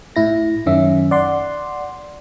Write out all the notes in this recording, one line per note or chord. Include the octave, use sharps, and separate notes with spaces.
A2 E4 A#6
F#2 D#3 C#4 E5
D5 F#5 C6